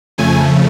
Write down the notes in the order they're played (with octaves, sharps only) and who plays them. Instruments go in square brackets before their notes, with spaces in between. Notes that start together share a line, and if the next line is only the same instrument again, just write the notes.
[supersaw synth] F2 C#3 F3 A3 G#5